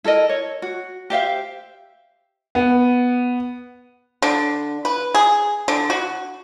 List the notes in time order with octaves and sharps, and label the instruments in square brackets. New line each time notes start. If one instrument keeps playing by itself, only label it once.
[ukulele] E4 A4 A#4 D#5
C#5
F#4
G4 C5 E5 F5
[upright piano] B3
[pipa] D3
B4
G#4
D3
F#4